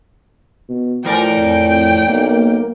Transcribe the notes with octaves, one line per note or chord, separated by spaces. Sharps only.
B2
A2 E3 F3 A#4 D5 G5
F2
B1 A#3